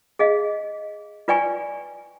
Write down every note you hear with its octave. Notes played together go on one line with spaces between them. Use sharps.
G#4 D#5 F5
F4 B4 D5 G5 G#5 C#6